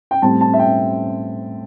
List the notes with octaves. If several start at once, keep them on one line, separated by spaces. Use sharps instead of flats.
G5
A2 G3 C4 A5
A5
E5
G5